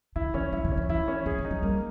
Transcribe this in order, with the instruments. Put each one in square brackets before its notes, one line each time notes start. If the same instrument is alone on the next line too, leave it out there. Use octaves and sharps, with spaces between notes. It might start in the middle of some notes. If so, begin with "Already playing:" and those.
[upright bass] D3 [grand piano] E4
[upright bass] E3 [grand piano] C#4
[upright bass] F#3 [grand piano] E4
[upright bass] D#3
[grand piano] C#4
[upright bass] E3
[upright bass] E3 [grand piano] E4
[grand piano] C#4
[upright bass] E3 [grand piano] G#4
[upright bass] D#3
[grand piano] D#4
[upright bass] F#3
[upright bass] G3 [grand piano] A#3